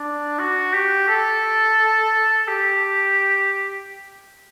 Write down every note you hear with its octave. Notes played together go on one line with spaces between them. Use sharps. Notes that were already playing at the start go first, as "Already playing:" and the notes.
Already playing: D4
F#4
G4
A4
G4